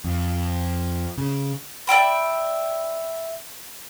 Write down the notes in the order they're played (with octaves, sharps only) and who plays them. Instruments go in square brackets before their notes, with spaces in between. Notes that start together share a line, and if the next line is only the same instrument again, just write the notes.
[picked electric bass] F2
C#3
[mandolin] D5 E5 G5 B5